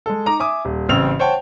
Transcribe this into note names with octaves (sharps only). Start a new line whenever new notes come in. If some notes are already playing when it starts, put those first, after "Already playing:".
G#3 A4
D#4 A#5 D6
E5 G#5 D6 D#6
D#1
A1 C#3 C4 E6 F7
C5 C#5 F#5 G5 A5